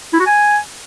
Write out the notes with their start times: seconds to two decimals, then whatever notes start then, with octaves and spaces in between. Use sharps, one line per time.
0.13 E4
0.20 F#4
0.27 G#5